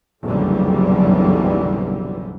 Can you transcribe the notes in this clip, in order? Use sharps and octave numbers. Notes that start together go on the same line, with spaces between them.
F#1 B1 F2 D3 E3 G3